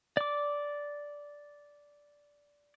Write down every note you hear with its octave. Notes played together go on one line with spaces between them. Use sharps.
D5 D6